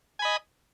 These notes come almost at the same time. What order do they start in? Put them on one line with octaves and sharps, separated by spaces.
G#5 B5 D#5